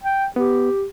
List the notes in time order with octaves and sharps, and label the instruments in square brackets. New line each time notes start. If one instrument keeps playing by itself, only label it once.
[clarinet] G5
[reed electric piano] B3 [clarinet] G4